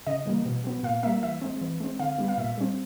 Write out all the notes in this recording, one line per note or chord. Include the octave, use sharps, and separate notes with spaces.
C#3 D#5
E3 G3 A#3
B2
F#3 B3
A#2 F5
G3 A#3 E5
E3 E5
G#3 C4
E3
G#3 C4
D3 F5
G3 B3
F5
A#2 E5
G3 C4